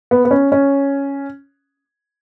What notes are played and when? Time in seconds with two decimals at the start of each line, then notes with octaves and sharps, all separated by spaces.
0.11 B3
0.25 B3
0.31 C#4
0.52 C#4